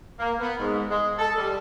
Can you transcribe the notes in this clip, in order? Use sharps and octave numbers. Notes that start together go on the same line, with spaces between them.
A#3
B3
G#2
G#3
A4
G3